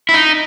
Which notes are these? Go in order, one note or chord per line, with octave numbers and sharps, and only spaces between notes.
E4
D#4